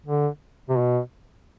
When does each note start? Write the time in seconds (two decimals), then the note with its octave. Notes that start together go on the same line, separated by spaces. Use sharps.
0.06 D3
0.69 C3
0.78 B2